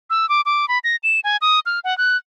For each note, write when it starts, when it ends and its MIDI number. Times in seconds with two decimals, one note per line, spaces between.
0.10 0.28 88
0.29 0.41 86
0.46 0.68 86
0.68 0.79 83
0.84 0.96 94
1.03 1.20 100
1.24 1.37 80
1.41 1.60 87
1.66 1.80 89
1.84 1.97 78
1.98 2.17 90